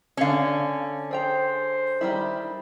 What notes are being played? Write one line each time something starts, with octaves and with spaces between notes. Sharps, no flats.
D3 C#4 D4 F5
G#4 C5 G5 A#5
D#3 G3 E4